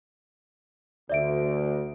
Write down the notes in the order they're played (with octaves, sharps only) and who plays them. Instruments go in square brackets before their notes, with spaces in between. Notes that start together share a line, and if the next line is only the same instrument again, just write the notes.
[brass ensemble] D2 [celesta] D5 E5 D7